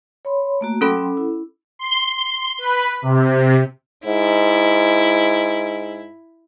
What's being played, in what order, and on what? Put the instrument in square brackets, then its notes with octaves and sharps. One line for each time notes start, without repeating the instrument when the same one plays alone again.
[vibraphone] C#5 B5 C6
A3 A#3 F#4
[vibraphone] F#3 G5 C6 [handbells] C#4 A4 B5
[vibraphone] E4
[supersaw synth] C6
B4
C3
[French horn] G#2 [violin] E4